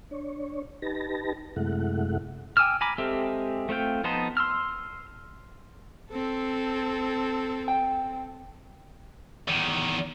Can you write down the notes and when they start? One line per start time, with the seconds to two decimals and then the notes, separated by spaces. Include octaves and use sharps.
0.11 D4 C#5
0.82 D#4 G4 B4 A5 A#6
1.56 F#2 C3 G#3 A3 E4 F#5
2.57 G5 G#5 D6 E6 F6
2.81 G#5 A#5 B5 D6
2.98 G#3 C4 G4 A4 E5
3.69 A3 C4 F4 G5
4.04 F3 B3 D#4 A5 C6
4.37 C6 E6 F6
6.11 C4 A4
7.68 G5
9.48 E2 D#3